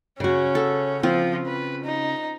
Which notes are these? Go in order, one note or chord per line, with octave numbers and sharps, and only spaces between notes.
C#3 C#4 F#4
A4
F3 C4 F4
B4
D#4